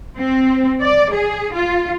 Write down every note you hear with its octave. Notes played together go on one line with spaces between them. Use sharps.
C4
D5
G#4
F4